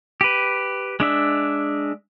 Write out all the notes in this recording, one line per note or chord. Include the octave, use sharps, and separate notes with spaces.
G4 B4
G#3 D4 E5